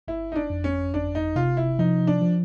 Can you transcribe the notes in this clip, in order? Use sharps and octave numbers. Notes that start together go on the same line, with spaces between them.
G1 E4
D#4
D4
F2
C#4
G1 D4
D#4
C3 F4
E4
F3 D#4
D4
F3